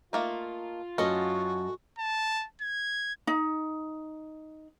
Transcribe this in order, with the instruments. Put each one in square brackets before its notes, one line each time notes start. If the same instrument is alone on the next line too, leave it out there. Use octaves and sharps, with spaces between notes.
[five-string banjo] A3 A#3 D#4 [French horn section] F4
[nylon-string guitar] F#2 A4 D#5 [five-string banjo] C#4 [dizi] F#4
[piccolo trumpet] A5
G#6
[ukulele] D#4